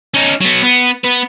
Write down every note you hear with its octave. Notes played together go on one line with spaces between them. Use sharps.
C#4 D#4
F#3 B3
B3
B3 B4